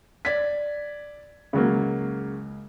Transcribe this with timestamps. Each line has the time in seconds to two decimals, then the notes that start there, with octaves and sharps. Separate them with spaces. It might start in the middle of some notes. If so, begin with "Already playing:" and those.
0.25 D5 G#6 B6
1.53 C#2 C#3 F#3 A#3